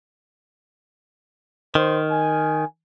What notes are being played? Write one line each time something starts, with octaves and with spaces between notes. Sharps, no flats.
D#3 C5
G#5